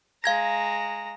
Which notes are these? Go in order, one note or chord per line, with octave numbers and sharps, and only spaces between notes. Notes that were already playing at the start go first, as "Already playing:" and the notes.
G#3 F5 A#5 G#6 A#6